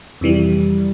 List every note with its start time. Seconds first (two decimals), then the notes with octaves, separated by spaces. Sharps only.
0.21 F2 C3 E3 G3